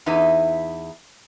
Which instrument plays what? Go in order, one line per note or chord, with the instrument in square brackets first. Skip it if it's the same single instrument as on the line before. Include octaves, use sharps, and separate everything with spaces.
[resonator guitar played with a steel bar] E2 D#4 E4 B4